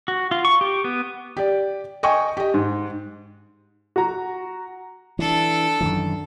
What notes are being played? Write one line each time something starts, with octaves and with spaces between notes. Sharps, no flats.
F#4
F4
C#6
G4
B3
G4 D5
D#5 G5 G#5 C#6
G4 D#5
G#2
F#4 A#5
E3 D4 A4
F#2 D#3 E3